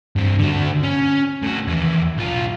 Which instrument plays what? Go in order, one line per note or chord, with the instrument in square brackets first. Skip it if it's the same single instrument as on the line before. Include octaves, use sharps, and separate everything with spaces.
[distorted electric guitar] G2 C4
D3 F#4
C#4
A2 F#4
D#2 E3
B1 F4